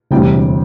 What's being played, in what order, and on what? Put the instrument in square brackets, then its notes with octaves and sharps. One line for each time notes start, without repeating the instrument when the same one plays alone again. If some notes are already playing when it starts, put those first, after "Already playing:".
[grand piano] E1 D2 C3 E3 G3 G5